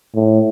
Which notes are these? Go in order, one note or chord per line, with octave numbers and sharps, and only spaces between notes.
A2